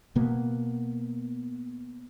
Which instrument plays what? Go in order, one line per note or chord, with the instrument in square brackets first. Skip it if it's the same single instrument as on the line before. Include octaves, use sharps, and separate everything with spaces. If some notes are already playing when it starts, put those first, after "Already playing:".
[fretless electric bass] B2 A#3 B3